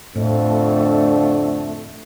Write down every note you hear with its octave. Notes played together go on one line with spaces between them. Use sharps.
F2 A2 D3 A3